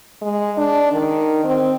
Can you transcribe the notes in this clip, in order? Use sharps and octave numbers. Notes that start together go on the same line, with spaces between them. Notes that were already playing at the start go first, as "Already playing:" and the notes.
G#3
D4
D#3
C4